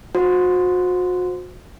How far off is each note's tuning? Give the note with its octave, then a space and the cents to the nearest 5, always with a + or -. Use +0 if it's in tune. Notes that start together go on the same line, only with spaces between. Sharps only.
F#4 -35 C5 -5